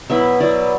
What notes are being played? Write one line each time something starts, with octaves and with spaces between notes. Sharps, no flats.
B2 F#3 B3 E4 E5
B2 F#3 B3 E4 D5